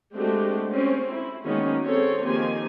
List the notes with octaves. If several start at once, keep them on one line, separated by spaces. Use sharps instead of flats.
G#3 A3 C4 D4 F#4 G4
C4 C#4
E4
D#3 F#3 G#3 A#3 B3 C#4
C4 G#4 A4 C#5
D#3 F3 A#3 C4 G4 G#5